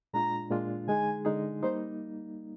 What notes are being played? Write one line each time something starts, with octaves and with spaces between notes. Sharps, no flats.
A#2 G#3 D4 F4 A#5
A#2 G#3 D4 F4
D3 G#3 D#4 G#4 G#5
D3 G#3 D#4 G#4
G3 A#3 D#4 C5